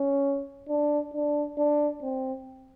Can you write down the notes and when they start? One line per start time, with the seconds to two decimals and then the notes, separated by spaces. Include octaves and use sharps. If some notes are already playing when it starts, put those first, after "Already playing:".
Already playing: C#4
0.68 D4
1.14 D4
1.57 D4
2.02 C4